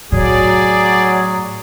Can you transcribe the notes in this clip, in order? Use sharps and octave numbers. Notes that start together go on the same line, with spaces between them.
A2 F#3 G#4 D5